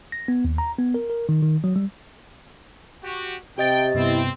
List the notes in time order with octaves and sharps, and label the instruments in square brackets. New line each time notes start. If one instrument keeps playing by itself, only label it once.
[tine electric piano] A#6
B3
D#2
A#5
B3
A#4
A#4
D#3
D#3
F#3
G3
[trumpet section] F#4 G4
[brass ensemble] C3 [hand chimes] G4 D#5 A6 [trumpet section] G5
[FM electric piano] G2 C3 B3 [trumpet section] C4 [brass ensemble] E4